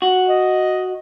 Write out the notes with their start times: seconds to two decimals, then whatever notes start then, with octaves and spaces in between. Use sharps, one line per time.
0.02 F#4
0.29 D#5